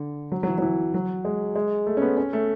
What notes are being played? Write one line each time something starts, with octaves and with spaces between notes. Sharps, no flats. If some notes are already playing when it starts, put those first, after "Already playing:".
Already playing: D3
F#3
F#3
E3
F#3
E3
F#3
G#3
G#3
A3
C#4
B3
C#4
A3